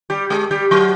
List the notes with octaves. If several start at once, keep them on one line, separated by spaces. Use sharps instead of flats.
G3 G4
G#3 G#4
G3 G4
F#3 F#4